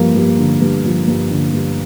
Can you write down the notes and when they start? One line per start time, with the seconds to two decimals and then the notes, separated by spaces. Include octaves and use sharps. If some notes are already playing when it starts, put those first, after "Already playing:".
Already playing: G2 F3 A#3
0.16 G2
0.39 D3
0.62 G2
0.85 F3
1.08 G2
1.31 D3
1.53 G2